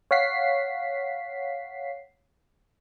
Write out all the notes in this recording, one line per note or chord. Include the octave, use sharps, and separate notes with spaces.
C#5 F5 F#5 B6 C7